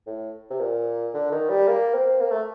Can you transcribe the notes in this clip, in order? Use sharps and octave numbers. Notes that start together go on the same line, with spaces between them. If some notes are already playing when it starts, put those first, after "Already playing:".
A2
C3
A#2
D3
D#3
G3
A#3
C4
A#3
A3